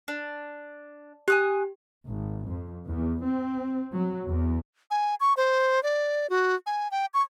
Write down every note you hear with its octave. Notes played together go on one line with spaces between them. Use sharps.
D4
G4 G#5 D#6 F#6
G#1
F2
E2
C4
F#3
E2
G#5
C#6
C5
D5
F#4
G#5
G5
C#6